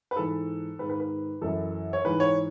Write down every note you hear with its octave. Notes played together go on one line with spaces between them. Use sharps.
B4
G#2 E3 A4
G#2 D#3 B4
B4
B4
F#2 E3 A4
C#5
G#2 E3 B4
C#5